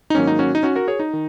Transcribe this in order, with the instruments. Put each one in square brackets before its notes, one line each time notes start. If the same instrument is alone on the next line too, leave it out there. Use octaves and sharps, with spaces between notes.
[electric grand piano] D#4
G#2 D#3 F#3 A#3 C#4
D#4
C#4 F#4
D#4
C#4 F#4
F#4 A#4
G#4 C#5
D#4
D#3